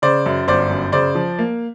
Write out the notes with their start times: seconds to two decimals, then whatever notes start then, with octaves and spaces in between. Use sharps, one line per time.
0.02 C#3 C5 D5
0.26 F#2
0.48 G1 C5 D5
0.70 F#2
0.92 C#3 C5 D5
1.15 F3
1.39 A#3